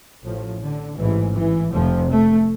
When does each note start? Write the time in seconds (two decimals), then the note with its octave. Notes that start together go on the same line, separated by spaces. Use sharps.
0.23 A1 A2 F3
0.61 D3
0.97 A1 G#2 E3
1.35 E3
1.72 F1 F2 C3 F3
2.10 A3